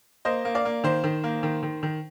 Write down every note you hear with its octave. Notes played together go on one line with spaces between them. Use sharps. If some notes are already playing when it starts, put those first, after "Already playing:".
A#3 C5 D#5
A#3
D5 F5
A#3
D#3 C5
D#3
A#3
D#3
D#3
D#3